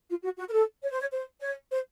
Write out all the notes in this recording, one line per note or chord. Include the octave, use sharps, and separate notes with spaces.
F4
F#4
F#4
A#4
A4
C#5
C5
C#5
C5
C#5
C5